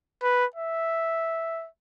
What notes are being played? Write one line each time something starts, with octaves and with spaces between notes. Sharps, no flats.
B4
E5